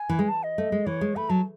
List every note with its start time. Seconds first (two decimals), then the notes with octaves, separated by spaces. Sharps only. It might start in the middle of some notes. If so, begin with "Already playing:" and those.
Already playing: G#5
0.09 E3
0.19 G#3
0.29 A5
0.43 D#5
0.58 A3
0.72 G#3
0.86 E3 C#5
1.01 G#3
1.16 A3 B5
1.30 F#3 A5